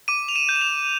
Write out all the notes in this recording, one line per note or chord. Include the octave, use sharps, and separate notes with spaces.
D6 D#7
F7
E7
G6
E7
F7